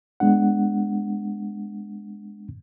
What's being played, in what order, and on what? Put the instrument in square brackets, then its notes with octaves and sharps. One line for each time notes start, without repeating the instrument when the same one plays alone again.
[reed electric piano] G#3 B3 D4 F#5